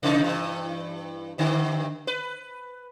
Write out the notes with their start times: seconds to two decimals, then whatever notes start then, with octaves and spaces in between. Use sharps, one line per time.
0.03 C3 E3 D#4
0.22 G2 E3
1.38 G2 D3 D#3
2.07 B4